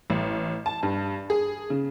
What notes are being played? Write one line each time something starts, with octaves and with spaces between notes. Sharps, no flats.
A1
A5
G2
G#4
C#3